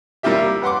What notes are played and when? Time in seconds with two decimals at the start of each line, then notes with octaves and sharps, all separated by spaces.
0.23 G3 A#3 E4 F4 G4 E5
0.62 B4 F#5 C6 D6